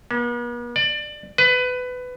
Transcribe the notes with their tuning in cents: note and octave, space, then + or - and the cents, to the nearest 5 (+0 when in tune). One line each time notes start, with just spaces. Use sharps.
B3 -45
D5 +25
B4 +20